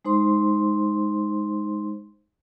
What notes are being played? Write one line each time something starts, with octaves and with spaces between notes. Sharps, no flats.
G#3 D#4 C5 C6